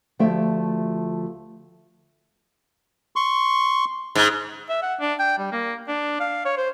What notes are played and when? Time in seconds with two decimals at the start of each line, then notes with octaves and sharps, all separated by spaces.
0.19 D2 F3 A3 G4 D5 E5
3.16 C6 C#6
4.15 G#2
4.69 E5
4.82 F#5
5.00 D4
5.19 G5
5.38 G3
5.52 A#3
5.88 D4
6.20 F5
6.45 C#5
6.57 C5